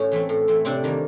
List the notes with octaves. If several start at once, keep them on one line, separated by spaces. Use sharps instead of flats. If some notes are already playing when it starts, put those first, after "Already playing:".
Already playing: A2 C#4
E3 A3 C4
A2
E3 A3 C4
C3 C4 D4
D#3 G3 A#3